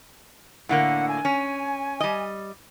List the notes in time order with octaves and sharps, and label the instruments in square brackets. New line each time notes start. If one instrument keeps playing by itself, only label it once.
[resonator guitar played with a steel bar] A2 D3 A#3 [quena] F#5
[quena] G#5
[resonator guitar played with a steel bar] C#4
G3 D#5